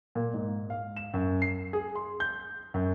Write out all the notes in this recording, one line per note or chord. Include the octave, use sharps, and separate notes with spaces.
A#2
G#2
F5
E7
F#2
C7
G#4
C6
G6
F#2